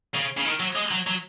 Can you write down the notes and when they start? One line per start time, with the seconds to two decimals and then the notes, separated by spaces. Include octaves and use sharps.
0.15 C#3
0.37 C#3
0.46 D#3
0.60 F#3
0.76 G#3
0.91 F#3
1.07 F#3